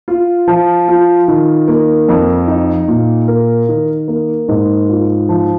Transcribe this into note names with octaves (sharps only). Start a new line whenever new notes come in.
F4
F3
F4
D#3
A#3
F2
D#4
A#2
A#4
D#3
A#3
G#2
F4
F3